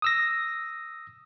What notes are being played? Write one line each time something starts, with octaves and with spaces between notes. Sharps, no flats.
D#6 E6 A#6